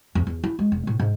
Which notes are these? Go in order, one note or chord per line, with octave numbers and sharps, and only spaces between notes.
F2
E2
E4
G#3
E1
A2
G#2